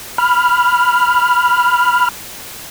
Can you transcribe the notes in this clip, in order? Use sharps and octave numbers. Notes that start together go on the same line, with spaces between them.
B5 F6